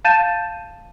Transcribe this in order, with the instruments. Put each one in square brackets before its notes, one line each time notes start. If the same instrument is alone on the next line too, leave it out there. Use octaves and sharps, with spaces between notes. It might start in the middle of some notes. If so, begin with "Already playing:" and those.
[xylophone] F5 A5 G6 A6 D#7 E7